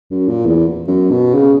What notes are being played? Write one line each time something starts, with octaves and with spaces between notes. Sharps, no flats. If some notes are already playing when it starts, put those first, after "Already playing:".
F#2
A#2
E2
F#2
B2
C#3